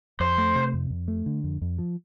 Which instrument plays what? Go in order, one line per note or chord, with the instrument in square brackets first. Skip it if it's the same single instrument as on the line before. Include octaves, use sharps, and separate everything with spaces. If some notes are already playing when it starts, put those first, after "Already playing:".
[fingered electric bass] F2 [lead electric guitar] C5
[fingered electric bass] A3
C3
F2
F2
A3
D3
F2
F2
F3